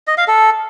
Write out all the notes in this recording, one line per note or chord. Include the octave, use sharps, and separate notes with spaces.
D#5
F5
A4